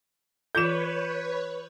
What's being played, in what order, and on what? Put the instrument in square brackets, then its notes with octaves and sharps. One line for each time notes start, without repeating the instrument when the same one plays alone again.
[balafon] E3 F4 A4 [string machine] B4 C#5 [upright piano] G6 E7